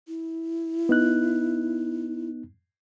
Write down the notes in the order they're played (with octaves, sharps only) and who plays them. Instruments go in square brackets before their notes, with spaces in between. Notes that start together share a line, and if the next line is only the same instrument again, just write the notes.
[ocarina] E4
[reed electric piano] B3 D#4 F#6